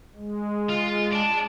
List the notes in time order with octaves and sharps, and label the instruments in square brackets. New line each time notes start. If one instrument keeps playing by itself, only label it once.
[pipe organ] G#3
[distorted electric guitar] F4
D5 A5